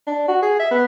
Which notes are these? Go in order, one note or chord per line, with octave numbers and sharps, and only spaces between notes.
D4
F#4
G#4
E5
B3